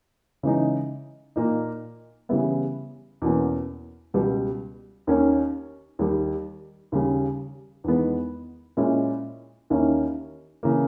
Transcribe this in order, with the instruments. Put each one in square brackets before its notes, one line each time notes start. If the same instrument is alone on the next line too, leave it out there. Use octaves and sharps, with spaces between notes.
[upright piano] C#3 E3 G#3 D#4
A#2 A#3 D#4
C#3 E3 G3 B3 E4
E2 B2 A#3 C#4
C#2 B2 G3
D#2 D#3 A#3 C#4
D#2 D#3 G3
D#2 C#3 G3
E2 D#3 G#3 B3
A#2 G#3 C#4 E4
D#2 D#3 A#3 C#4 E4
C#3 E3 A#3